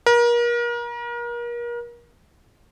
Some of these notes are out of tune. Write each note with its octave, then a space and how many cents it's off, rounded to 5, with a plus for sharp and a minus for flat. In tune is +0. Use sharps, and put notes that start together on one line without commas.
A#4 +35